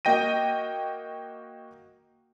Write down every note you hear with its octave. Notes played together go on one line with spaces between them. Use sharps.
A#3 F#4 D#5 G5 A#6 D#7